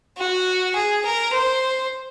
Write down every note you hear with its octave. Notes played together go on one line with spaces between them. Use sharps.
F#4
G#4
A#4
C5